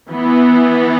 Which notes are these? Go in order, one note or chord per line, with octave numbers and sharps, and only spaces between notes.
E3 B3